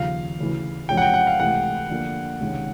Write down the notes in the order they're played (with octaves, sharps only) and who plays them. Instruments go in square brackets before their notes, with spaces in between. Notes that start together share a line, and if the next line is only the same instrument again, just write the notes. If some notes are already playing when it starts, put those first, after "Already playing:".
Already playing: [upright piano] D#2 C#3 F3 [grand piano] F5
[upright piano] D2 C#3 E3
[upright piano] E2 C3 F3 G#3 C#4 [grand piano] G5
[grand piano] F#5
G5
F#5
F5
[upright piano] C#2 C3 E3 A3 [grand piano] F#5
[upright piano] D3 F3 A#3 D4
C#2 C3 D#3 G#3 C#4